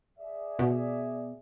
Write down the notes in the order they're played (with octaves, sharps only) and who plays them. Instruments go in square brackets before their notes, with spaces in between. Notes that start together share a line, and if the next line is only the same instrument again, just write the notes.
[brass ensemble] G#4 D5 E5
[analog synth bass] B2